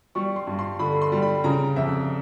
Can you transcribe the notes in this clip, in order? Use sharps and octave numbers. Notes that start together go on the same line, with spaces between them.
G3 C#6
C6
G2
C6
D3 B5
C6
G3
B5
C#3 A#5
F2 E5